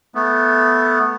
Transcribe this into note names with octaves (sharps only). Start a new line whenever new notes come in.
A3 B3